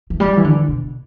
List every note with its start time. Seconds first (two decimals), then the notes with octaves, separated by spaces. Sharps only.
0.10 E3
0.20 G3
0.37 E3
0.44 D3
0.68 B2